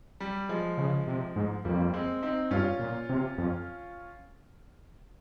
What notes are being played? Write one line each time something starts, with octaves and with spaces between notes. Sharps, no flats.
G3
F3 G#3
C#3
C3
G#2
F2 G3 A#3
G#3 C4
C4 D#4
G2 C#4 F4
A#2
C3
F2